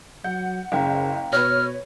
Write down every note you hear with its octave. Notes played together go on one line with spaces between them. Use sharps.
F#3 F#5 G6
F#1 C#3 F5 G5 A#5
B2 B4 C#5 F6 A#6